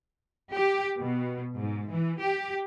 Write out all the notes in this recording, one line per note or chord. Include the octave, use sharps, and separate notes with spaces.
G4
B2
G#2
E3
G4